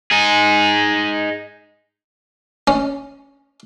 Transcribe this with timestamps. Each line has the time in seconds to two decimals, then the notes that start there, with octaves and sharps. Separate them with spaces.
0.11 D#4 G#4
2.67 C#4